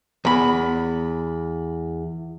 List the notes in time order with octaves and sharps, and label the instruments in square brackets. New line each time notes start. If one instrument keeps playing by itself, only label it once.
[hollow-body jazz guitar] E2 B5